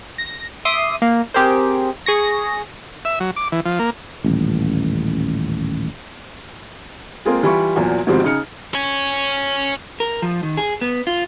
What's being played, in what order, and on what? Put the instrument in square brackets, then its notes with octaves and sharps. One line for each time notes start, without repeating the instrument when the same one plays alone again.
[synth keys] A#6
E5 C6 D6 D#6
A#3
C4 G4 G#4 A#4 C5
G#4 C#6 A#6
[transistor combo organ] E5
F#3
D6
E3
F3
A#3
[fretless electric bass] D#1 A1
[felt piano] G#3 A#3 C4 F4 G#4
E3 G3 F4 B5 C#6
E2 A#2 F3 F#3
G#2 B2 D#3 F3 G3 C4
C#3 D#4 G#4 F6 C#7
[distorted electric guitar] C#5 G#5
[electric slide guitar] A#4
F3
D#3
G#4
B3
F4